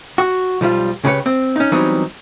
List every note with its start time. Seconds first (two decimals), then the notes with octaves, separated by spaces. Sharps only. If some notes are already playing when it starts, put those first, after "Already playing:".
0.18 F#4
0.61 B1 F3 G3 F4
1.04 C#2 C#3 G4 B4 C#5
1.26 C4
1.56 C#4 D#4
1.72 E3 F#3 G3 B3 C4 D#4